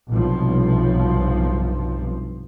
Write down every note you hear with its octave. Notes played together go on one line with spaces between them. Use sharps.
B1 G2 C3 F3